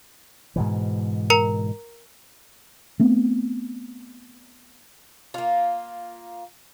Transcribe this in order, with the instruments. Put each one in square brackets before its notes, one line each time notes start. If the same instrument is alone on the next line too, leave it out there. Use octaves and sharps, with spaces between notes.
[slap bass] G#2 B2 E3
[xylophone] A#4 A#5 C#7
[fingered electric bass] A3 B3 C4
[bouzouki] A#3 F4